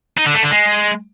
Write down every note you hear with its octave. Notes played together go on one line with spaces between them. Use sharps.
D#4
D3
A3
D3
G#3